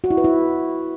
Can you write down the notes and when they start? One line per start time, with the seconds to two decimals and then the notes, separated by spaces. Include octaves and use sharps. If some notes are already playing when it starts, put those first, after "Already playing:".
0.04 F#4
0.11 E4
0.17 B4
0.24 E4